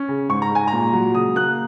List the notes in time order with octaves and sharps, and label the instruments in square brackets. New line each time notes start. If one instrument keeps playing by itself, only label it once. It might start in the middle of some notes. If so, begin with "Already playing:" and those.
Already playing: [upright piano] C#4
C#3
G#2 C#6
A#5
G#3 G#5
A#2 A#5
F#3
C#3 D#6
A#3 F#6